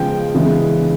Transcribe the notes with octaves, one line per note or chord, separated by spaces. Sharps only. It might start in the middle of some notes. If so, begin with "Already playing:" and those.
Already playing: C#3 F3 G#3 B3 G5
C#3 E3 G#3 B3 D4